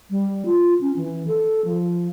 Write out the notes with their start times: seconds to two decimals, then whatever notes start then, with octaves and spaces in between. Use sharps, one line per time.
0.10 G3
0.46 F4
0.81 C#4
0.96 E3
1.27 A4
1.65 F3